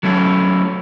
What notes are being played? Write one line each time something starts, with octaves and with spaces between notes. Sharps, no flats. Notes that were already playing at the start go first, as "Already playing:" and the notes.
F#3 A3 C#4 E4